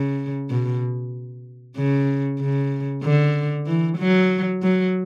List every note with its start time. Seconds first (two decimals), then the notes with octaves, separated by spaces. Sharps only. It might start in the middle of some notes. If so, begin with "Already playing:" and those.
Already playing: C#3
0.50 B2
1.77 C#3
2.40 C#3
3.03 D3
3.67 E3
3.98 F#3
4.62 F#3